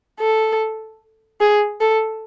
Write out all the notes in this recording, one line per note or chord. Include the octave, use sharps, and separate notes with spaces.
A4
G#4
A4